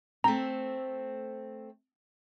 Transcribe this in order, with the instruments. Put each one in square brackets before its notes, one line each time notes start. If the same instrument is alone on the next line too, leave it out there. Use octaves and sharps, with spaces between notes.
[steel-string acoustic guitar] A3 C4 [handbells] A#5